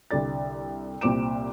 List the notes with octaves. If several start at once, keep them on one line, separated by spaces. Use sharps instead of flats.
C2 D3 D5 A6
C2 A#2 C4 D6 D7 E7